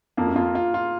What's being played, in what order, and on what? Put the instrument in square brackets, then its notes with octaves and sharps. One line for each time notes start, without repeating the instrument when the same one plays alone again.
[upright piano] F2 [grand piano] A#3
[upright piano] F#2
[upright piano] F2 [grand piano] F4
[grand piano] F4
F4